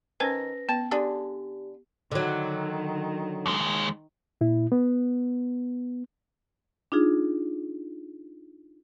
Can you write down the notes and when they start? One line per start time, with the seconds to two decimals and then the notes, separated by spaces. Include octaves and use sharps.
0.20 D#3 C#4 B4 C5 G#5 A#6
0.69 B3 A5
0.91 D3 D4 G4 G#4
2.11 D3 D#3 F#3
3.46 D#2 G#3
4.41 A#2 E4
4.72 B3
6.92 D4 D#4 F4 G#4